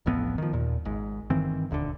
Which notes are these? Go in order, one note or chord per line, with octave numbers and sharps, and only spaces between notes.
D1 A1 F2 B3
D#3 F3
D#2 A#2
G#1 G#2
G2 D#3 E3 C4
D#1 D2 B2 D3